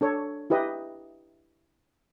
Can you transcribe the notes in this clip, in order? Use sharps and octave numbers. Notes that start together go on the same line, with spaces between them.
D4 A4 C#5
E4 G4 B4 D#5